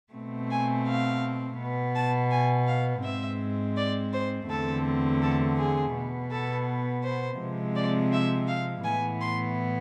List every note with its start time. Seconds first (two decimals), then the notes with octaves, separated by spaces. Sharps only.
0.13 B2 A3 C4
0.50 G#5
0.86 F5
1.58 B2 B3
1.94 A5
2.31 G#5
2.67 F5
3.03 G#2 G#3 C4 E5
3.76 D5
4.12 C5
4.48 E2 D3 A3 C4 A4
5.21 A4
5.57 G#4
5.94 B2 B3
6.30 A4
7.03 C5
7.38 C3 F3 G#3 C4
7.75 D5
8.12 E5
8.47 F5
8.84 A2 E3 B3 G#5
9.20 C6